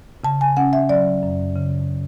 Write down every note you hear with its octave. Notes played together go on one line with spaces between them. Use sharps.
C#3 A5
G#5
C#4 F#5
E5
F#3 D5
F#2
C#3